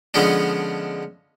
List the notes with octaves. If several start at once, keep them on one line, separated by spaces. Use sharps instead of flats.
D3 F3 G#3 B3 C#4 D4